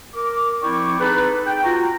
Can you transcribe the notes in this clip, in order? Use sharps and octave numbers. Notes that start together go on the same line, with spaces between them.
A#4 D6
F3 C4 E4 D5 G5 C#6
C4 D#4 G#4 A4 B4
G5
F4 F#4 A#5